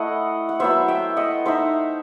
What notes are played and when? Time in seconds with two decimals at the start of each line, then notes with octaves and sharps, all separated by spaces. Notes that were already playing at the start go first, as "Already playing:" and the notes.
Already playing: A3 E4 D#5 F#5
0.49 F#5
0.59 F#3 B3 E4 C5 E5
0.88 E5 G5
1.17 D#5 F#5
1.45 A3 D#4 C5 E5